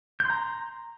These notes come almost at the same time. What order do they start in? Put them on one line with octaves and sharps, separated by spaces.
G6 C6 A#5